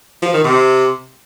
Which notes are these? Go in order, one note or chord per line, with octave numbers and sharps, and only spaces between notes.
F3
D#3
C3